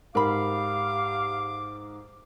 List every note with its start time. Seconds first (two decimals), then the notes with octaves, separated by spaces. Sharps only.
0.15 G#2 G4 A#4 F5 B5 D6